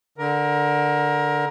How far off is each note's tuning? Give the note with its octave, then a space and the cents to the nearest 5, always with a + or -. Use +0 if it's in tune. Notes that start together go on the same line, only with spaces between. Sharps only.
D3 +0 A#4 +15